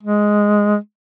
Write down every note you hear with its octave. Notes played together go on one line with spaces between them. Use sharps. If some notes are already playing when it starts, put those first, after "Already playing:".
G#3